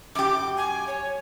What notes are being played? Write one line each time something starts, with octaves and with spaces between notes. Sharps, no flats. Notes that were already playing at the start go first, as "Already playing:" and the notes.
F#2 G4 D6
G#5
C#5